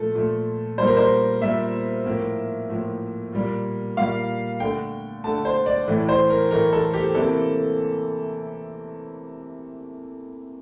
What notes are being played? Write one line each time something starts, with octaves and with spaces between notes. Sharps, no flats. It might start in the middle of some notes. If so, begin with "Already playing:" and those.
Already playing: A#2 F3 A3 A4
A#2 F3 A3
A#2 G3 A#3 C5
A#4
C5
A#2 G3 A#3 E5
A2 F3 A#3
A2 F3 A#3
A#2 G3 A#3
A#2 G3 A#3 F5
D3 A3 G5
D3 A3 A5
C5
D5
A2 E3 A3
C5
A#4
A2 E3 A3 A#4
A4
G4
C3 E3 A#3 A4